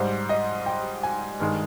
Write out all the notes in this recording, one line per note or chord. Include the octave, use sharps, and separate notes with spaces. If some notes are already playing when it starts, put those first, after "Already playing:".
Already playing: G#2 G3 C5
D#5
G5
G#5
G2 D#3 G#3